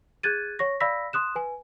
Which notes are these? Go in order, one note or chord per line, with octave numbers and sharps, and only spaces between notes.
G#4 F#6 G#6 A6 D#7
C#5 C#6 A#6
D5 F5 B5 E6 A#6 B6
C6 D#6 F#6 E7
B4 G#5